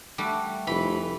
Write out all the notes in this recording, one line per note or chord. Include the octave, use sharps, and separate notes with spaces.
G3 A3 F#4
F1 E3 B5